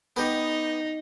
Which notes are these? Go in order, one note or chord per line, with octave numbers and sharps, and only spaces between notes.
B3 D#4 G4 D#5